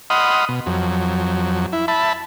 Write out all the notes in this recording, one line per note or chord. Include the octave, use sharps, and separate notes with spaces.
D#5 F#5 B5 C6 D#6 F6
B2
F2 F#3
E4
E5 A5 B5